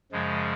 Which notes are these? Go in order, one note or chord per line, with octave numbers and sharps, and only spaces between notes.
F#2 C#3 F3 G#3